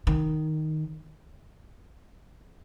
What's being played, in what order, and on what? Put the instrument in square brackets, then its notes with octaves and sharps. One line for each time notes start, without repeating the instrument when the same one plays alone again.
[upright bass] D#3